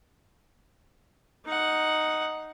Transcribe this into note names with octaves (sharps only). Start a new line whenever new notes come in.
D#4 F#5